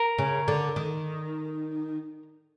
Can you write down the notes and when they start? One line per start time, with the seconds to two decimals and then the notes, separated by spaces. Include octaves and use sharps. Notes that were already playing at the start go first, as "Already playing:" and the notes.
Already playing: A#4
0.18 C#3
0.48 D3
0.76 D#3